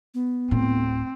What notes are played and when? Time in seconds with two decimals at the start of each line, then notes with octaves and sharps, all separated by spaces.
0.14 B3
0.51 D1 A2 C4